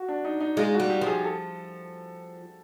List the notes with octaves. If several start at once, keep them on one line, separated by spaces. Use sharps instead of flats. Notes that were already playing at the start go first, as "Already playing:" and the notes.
Already playing: F#4
D4
D#4
D#4
G#3 F4
F#4
G3
G4
F3 G#4
A4